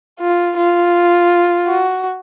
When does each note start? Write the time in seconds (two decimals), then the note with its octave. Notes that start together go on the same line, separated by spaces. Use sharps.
0.20 F4
0.57 F4
1.67 F#4